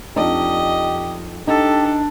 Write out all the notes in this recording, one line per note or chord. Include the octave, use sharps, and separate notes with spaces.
F2 D4 D#4 G4 D#5
D4 D#4 G4 A4